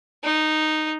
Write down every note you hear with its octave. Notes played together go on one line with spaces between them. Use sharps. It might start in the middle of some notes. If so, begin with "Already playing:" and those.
D#4